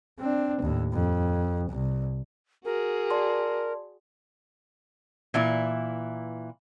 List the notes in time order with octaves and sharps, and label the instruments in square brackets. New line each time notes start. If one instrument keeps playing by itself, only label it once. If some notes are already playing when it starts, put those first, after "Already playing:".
[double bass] C4 D4
D#2 A2
F2
C2
[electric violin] F#4 G#4 [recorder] A#4
[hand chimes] D5 A5 C6
[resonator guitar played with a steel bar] A#2 E3 E4